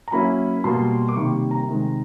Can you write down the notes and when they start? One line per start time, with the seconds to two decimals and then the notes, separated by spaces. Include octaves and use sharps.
0.08 A#5
0.12 F#3 A#3 C#4 E4 B5
0.64 B2 G3 A#3 C6
1.09 D6
1.16 C3 D#3 G3 A#3 C#6
1.51 A#5
1.68 C3 D#3 G#3